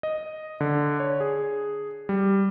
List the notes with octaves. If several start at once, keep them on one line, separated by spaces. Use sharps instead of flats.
D#5
D3
C#5
G#4
G3